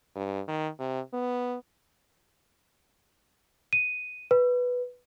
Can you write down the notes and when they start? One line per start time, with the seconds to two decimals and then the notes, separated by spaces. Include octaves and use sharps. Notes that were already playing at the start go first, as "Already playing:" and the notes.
0.16 G2
0.48 D#3
0.79 C3
1.14 B3
3.73 D#7
4.31 B4